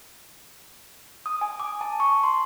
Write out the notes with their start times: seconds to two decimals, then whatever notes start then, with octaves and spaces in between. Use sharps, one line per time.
1.26 D#6
1.41 G#5
1.60 D6
1.81 A5
2.00 C#6
2.23 C6